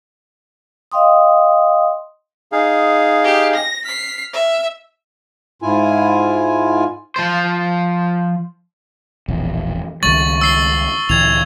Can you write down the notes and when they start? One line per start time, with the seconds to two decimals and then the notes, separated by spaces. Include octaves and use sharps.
0.92 D#5 F5 G5 C6 D#6
2.52 D#4 G#4 F5
3.24 G4
3.55 A#6
3.85 F6 B6 C7
4.33 E5
5.62 G#2 E4 F4 G#5
7.16 F3 C5
9.28 E1 A#1 E2
10.03 C#2 D#3 G3 C#6 A6 F#7
10.41 E6 C7 G7
11.09 D2 A#2 E3 G#6 F7